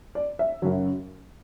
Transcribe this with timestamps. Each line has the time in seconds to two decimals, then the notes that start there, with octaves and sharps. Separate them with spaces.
0.15 D5
0.39 E5
0.62 F#2 C#3 F#3